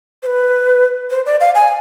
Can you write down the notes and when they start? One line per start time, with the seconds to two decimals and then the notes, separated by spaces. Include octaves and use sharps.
0.23 C5
0.26 B4
1.10 C5
1.26 D5
1.40 F5
1.55 G#5